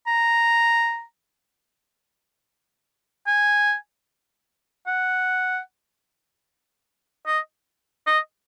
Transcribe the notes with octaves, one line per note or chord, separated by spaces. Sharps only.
A#5
G#5
F#5
D#5
D#5